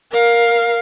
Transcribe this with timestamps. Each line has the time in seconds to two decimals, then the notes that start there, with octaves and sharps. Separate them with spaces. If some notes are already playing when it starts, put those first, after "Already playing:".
0.11 A#4 F5